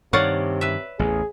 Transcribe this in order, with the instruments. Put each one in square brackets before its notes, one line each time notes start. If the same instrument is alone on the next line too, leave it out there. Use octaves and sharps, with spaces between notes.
[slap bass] G2 D#3 [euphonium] C3 [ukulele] C#5 [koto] D5 F5 F#5
[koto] B4 E5
[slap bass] A1 E2 [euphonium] G#4